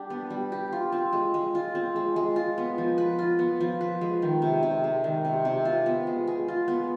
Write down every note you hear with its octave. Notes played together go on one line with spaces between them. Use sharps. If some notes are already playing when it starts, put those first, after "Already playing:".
Already playing: G3 D4 G4
B3
G3
G4
F4
C4
G#3
G#3
F4
C4
G#3
G#3
F4
B3
F3
B4
F4
B3
F3
B4
G#3
D#3
C3
C3
G#3
D#3
C3
C3
F4
B3
G#3
G#4
F4
B3